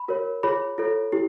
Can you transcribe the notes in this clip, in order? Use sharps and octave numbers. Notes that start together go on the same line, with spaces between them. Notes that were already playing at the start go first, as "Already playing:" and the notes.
Already playing: B5
F#4 A#4 C#5
F4 G#4 C#5 B5
F4 A4 C#5
E4 G4